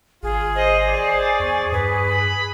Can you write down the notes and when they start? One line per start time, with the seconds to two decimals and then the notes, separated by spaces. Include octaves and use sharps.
0.23 G#1 F4 G#4
0.56 C5 D#5
0.88 D5
1.40 E2 C#6
1.72 G2 B4
2.08 B5